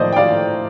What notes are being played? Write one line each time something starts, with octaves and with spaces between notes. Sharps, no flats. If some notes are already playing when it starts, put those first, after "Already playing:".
Already playing: A2 F3 A#3 C5 D5 D#5
G5
D5 F5